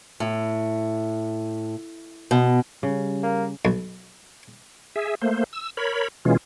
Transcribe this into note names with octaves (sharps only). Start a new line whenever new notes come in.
A2
B2
C#3 G3
A#3
B1
G#4 E5
A3 A#3 C5
E6
A#4 C#5 B5
B2 E3 G#3 C#4 F4